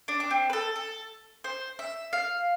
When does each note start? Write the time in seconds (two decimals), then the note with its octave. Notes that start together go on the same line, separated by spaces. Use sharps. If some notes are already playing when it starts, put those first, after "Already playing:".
0.08 D4
0.20 D4
0.30 C4
0.50 B4
0.53 A4
0.76 A4
1.44 C5
1.79 E5
2.13 F5